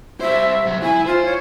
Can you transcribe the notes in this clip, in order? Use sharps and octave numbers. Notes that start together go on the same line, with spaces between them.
G3 C5 E5
C3 F#3
E4 G#5
F4 C5
C#5